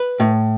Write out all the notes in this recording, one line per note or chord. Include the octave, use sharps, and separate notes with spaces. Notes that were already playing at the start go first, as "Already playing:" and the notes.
Already playing: B4
A2